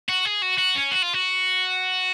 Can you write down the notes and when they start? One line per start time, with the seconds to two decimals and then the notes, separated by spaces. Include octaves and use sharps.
0.09 F#4
0.26 G#4
0.42 F#4
0.58 F#4
0.76 C#4
0.92 F#4
1.03 F4
1.14 F#4